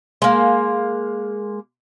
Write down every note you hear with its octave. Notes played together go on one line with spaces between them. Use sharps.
G#3 A#3